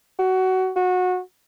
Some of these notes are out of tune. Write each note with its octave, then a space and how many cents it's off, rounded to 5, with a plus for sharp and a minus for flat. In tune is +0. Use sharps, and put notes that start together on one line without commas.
F#4 +20
F#4 -25